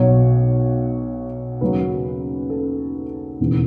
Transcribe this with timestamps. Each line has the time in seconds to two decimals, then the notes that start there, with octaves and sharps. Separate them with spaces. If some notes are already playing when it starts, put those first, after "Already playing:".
Already playing: B1 B2 F#3 C#5
1.61 D#2 C#3 F#3 B4
2.50 A4
3.40 E1 D#2 C#3 E3